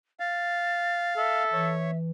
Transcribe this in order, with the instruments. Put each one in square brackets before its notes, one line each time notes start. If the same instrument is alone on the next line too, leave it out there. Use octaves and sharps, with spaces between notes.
[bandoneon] F5 [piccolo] A6
[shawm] A4 [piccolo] E5
[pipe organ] E3 [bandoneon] C#5